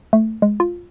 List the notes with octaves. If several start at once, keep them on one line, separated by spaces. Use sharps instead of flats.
A3
G#3
F4